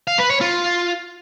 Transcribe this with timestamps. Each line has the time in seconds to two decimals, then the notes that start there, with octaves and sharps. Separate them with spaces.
0.07 F5
0.19 B4
0.30 C#5
0.41 F4